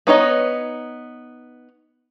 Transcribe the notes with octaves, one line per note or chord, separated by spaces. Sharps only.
B3 D#4 C#5 D#5